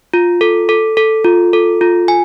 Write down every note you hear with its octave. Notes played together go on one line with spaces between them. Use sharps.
F4
A4
A4
A4
F4
A4
F4
G#5